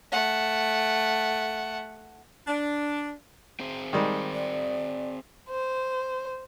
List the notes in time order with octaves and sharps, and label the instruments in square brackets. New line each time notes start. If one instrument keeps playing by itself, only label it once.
[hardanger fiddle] A3 F#5
[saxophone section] D4
[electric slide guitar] C4 G#4 C5
[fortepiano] D#3 G3 G#3
[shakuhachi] D5
[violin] C5